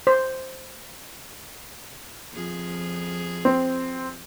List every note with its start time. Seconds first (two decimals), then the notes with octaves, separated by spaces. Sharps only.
0.07 C5
2.32 F2 F3 G#4
3.45 C4